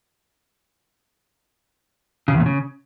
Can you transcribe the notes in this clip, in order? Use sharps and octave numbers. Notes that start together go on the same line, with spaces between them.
C#3
E2
A#2
C#3